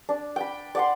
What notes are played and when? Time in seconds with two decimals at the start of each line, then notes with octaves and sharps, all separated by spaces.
0.09 D4
0.36 G5 B5
0.75 D5 F#5 C6